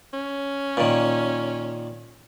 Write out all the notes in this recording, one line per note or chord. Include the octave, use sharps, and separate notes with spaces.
C#4
A#2 D#3